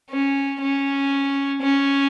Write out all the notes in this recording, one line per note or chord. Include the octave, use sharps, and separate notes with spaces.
C#4
C#4
C#4